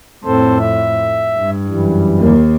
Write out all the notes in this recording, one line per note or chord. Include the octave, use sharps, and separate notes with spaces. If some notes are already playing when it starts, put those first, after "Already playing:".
F2 A2 C4 A4 C5
E5
G2
F#2 E3 G3
D#2 A#3